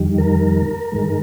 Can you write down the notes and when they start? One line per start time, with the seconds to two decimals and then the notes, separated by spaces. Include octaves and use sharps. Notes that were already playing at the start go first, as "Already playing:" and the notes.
Already playing: F2 D#3 G3
0.18 A#4
0.92 G2 D#3 G#3